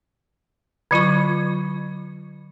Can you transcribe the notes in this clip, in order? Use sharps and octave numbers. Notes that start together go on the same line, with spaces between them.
D3 F#3 F4 C#6